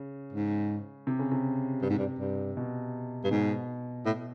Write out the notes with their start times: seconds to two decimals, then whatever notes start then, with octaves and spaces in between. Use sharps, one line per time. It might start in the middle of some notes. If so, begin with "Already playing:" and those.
Already playing: C#3
0.33 G#2
1.07 C3
1.19 C#3
1.31 C3
1.82 G2
1.90 G#2
1.99 G2
2.19 G2
2.57 B2
3.24 G2
3.31 G#2 B2
4.06 A2